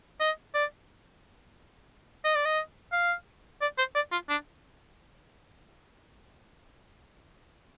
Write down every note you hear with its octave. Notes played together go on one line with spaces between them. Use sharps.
D#5
D5
D#5
D5
D#5
F5
D5
C5
D5
F4
D4